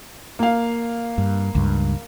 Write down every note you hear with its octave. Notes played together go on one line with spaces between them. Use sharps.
A#3 F5
G2
C#2 G2